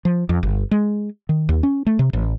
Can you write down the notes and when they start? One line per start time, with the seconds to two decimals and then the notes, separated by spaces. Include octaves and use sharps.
0.05 F3
0.29 F2
0.43 G1
0.71 G#3
1.29 D#3
1.49 D#2
1.63 C#4
1.86 A3
1.99 C3
2.13 A1